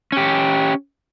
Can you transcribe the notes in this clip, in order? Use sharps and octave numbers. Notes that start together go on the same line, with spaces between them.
C#4 G4